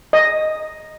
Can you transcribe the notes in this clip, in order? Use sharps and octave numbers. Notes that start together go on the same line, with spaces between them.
D#5